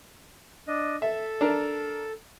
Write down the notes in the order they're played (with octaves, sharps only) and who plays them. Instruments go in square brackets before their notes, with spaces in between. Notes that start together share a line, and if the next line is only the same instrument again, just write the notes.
[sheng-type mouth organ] D4 D#5
[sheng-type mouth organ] A4 [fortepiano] E5
[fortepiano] D4 A#4